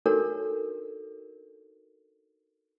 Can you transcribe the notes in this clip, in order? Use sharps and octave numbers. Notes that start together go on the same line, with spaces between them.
D4 D#4 F#4 A4 A#4 C#5